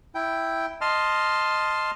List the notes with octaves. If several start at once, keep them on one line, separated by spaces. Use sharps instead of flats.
E4 G5
D#5 A5 C6 F6